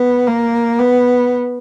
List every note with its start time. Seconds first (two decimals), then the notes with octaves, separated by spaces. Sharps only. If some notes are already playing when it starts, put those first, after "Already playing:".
Already playing: B3
0.27 A#3
0.79 B3